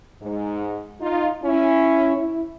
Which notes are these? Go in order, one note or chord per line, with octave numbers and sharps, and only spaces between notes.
G#2
D#4 F4
C#4 E4
E4